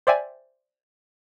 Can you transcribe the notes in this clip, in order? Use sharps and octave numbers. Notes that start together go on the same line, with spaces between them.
C5 D5 E5 G5 G#5